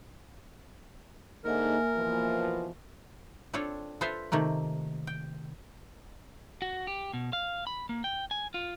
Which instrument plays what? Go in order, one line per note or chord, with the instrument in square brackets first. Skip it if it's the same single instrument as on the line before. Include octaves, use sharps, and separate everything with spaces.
[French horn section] G#2 D3 D#4 [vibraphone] A#3 E5 G#5 [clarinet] A#4
[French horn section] B2 E3 F3
[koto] C4 D4 F4 A4 C#5
F4 A4 B4 C5 E5 F5
C3 D#3 A3 A#3
G5
[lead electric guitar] F#4
G4
B2
F5
B5
A#3
G5
G#5
F4